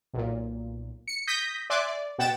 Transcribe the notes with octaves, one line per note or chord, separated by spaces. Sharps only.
B1 A#2
C#7
D#6 G6 A#6 B6
D5 E5 G#5 C6 D6 F#6
D5
B2 B3 F#5 G5 A6 E7